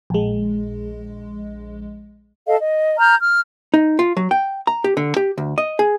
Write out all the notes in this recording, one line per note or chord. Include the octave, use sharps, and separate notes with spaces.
A#1 G#3
A4 D#5 F5
D#5
A#5 F6 G6
F6
D#4
F4
F#3
G5
A#5
G4
D3
G4
D2
D#5
G#4